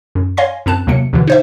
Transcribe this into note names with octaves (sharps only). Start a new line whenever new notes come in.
F#2
C#5 F5 G#5 C6 A#6
F#2 C4 A5 F#6
D#2 C3 F#3 A#3 C#7
D#2 B2 D3 E3
D#4 C5 E5